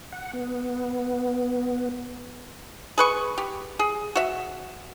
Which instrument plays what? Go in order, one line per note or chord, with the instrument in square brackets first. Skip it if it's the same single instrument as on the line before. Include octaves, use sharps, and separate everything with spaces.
[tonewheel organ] F#5
B3
[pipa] G#4 B4 C#6
G4
G#4
F#4 E5